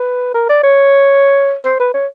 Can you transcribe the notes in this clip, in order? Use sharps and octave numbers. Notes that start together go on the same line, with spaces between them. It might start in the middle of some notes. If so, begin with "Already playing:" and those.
Already playing: B4
A#4
D5
C#5
C5
B4
C#5